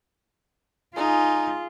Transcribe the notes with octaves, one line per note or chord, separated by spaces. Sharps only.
D#4 F4 G#4